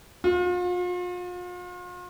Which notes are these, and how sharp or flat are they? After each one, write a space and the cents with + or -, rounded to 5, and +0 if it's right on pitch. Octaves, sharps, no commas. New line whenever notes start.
F4 +40